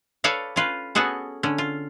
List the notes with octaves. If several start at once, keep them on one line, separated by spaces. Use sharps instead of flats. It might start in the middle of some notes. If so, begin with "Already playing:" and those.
A4 B4 C#5 D5 F5
C#4 F4 B4
B3 C#4 F#4 G#4 A4
D3 C#4
F4